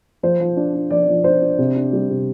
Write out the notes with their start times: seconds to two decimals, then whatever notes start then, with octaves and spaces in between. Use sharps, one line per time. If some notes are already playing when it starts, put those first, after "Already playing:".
0.23 F3 C5
0.40 F3
0.57 D4
0.74 D4
0.91 F3 D5
1.08 F3
1.24 D4 C5
1.42 D4
1.58 C3
1.76 D4
1.92 G3
2.09 C3